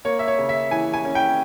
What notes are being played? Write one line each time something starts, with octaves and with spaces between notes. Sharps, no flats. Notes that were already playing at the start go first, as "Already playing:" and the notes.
A#3 C#5
E5
C#5
C#3
E5
E3 G#5
G#5
C#4
G5